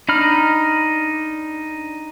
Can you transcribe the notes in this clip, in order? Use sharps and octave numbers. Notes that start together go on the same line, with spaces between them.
D4 D#4 B5 F6